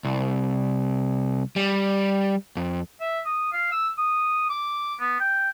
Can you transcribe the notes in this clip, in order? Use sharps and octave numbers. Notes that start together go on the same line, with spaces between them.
C2
G3
F2
E5
D#6
F5
E6
D#6
D6
B3
G5